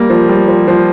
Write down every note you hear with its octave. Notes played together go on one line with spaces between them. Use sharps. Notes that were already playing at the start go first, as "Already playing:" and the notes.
Already playing: G3 A#3
F3
G3
F3
F3